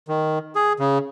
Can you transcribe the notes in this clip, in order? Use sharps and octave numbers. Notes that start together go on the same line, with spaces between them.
D#3
G#4
C#3